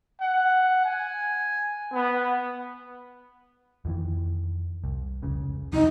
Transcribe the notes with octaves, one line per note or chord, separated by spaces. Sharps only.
F#5
G#5
B3
F2 D#3 E3
C2
F1 C#2 C#3
E2 C3 F#3 D#4